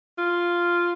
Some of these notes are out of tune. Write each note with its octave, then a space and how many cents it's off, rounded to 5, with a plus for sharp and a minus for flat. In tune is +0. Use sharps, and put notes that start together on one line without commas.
F4 -5